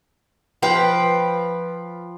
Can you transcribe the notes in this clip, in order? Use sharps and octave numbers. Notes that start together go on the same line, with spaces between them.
F3 B4 G5